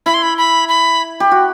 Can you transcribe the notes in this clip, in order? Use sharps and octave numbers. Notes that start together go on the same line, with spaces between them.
E4 B5
C6
B5
B5
B5
G4
F#4